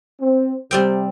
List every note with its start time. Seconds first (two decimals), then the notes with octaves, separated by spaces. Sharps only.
0.21 C4
0.71 C3 G3 C4 G5